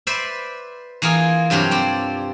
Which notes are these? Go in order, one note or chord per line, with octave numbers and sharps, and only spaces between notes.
B4 C5 D5 E5
E3 A#3 F4 G#4 A#4
G2 C3 F#3 C4 F4 G4
C4 D5